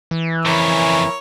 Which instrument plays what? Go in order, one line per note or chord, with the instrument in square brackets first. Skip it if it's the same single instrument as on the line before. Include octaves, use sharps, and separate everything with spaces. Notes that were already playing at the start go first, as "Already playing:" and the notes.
[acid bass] E3
[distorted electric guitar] F2 C#3 [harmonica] E4 A#4 C#5